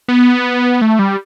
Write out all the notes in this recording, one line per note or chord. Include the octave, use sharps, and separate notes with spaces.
B3
A3
G3